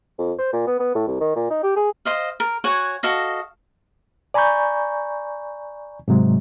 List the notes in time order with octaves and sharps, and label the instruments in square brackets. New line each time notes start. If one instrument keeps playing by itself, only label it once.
[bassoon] F2
C5
A#2
B3
B3
A2
C2
D#3
A#2
D#4
G4
G#4
[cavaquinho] C5 D#5 F5
A#4
F#4 C#5 F#5 G#5
F#4 A4 D#5 F5
[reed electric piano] D5 G#5 A#5 B5 C#6 G6
G#2 C3 F#3 G#3